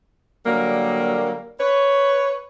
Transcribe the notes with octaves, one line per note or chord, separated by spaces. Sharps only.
D3 F#3 G3 A#3
B4 C#5